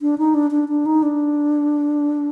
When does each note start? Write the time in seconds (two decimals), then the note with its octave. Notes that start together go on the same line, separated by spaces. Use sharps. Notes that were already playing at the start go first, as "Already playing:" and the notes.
0.01 D4
0.18 D#4
0.34 D4
0.51 D4
0.68 D4
0.86 D#4
1.03 D4